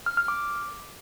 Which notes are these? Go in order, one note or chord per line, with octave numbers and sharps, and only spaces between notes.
F6
F6
D6